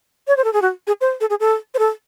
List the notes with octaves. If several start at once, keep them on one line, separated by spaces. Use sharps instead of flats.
C#5
C5
A4
G#4
F#4
G#4
C5
A4
G#4
A4
C5
A4